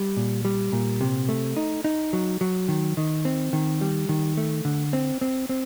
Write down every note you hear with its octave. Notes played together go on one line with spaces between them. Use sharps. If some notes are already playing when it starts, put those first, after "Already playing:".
Already playing: G3
A#2
G3
A#2
C3
A3
D#4
D#4
F#3
F#3
D#3
D#3
C4
D#3
G3
D#3
A3
D3
C4
C4
C4